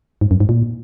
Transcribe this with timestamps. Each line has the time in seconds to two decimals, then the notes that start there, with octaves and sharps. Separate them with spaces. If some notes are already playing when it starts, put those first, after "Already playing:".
0.21 G#2
0.31 F#2
0.40 G#2
0.49 A#2